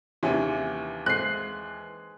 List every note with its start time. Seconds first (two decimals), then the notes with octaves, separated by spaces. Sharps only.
0.23 D#2 C3 E3 C#4 G#4
1.06 G#3 C4 F#6 C7